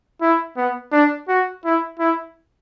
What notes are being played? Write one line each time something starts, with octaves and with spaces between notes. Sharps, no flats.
E4
B3
D4
F#4
E4
E4